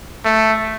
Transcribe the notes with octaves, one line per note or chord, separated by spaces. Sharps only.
A3